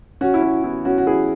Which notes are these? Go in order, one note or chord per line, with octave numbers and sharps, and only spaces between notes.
C#4 F#4
E4
C#4 F#4
B3 E4
C#4 F#4
F#4
E4 G#4